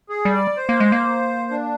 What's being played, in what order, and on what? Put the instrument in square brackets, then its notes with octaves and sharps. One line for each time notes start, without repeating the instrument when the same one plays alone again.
[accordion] G#4
[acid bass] G3
[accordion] D5
C5
[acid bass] A#3
G#3
A#3
[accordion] D4